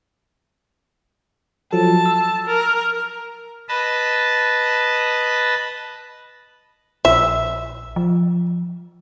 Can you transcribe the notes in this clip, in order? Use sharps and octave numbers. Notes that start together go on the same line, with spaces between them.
F3 F#3 A4 A5
E6
A#4
B4 D#5 A5 B5
A#1 E5
F3